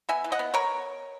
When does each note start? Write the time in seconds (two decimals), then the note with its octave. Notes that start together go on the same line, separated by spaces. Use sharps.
0.09 B3 E5 G#5
0.24 E3
0.32 D#5 F#5
0.39 B3
0.54 B3 A#4 C#5